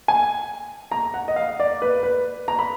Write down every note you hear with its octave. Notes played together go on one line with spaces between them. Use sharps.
G#5
A#5
F#5
D#5
F5
D5
B4
B4
A#5
B5